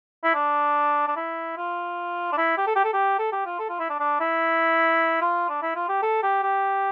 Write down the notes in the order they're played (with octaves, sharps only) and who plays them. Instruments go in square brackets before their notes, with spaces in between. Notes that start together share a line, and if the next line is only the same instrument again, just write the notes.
[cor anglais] E4
D4
D4
E4
F4
D4
E4
G4
A4
G4
A4
G4
A4
G4
F4
A4
F4
E4
D4
D4
E4
F4
D4
E4
F4
G4
A4
G4
G4